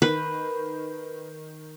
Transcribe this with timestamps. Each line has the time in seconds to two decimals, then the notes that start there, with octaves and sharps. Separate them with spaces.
0.02 D#3 B4